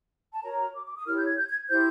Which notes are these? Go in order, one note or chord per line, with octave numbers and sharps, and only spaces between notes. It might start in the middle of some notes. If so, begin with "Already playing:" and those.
A5
F#4 A#4 C#5 A#5
D6
D6
D#6
E4 G4 A#4 C#5 F6
G6
G#6
G6
G#6
E4 G4 C5 G6